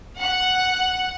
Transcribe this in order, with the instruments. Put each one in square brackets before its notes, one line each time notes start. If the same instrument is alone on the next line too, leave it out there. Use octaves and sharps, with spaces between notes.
[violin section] F#5